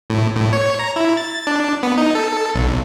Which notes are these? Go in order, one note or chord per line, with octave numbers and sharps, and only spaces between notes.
A2
A2
C#5
A#5
E4
A6
D4
B3
D#4
A4
B1